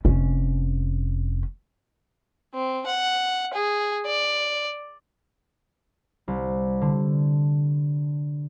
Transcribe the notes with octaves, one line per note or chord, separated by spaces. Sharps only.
F1 C#4
C4
F#5
G#4
D5
C2
D3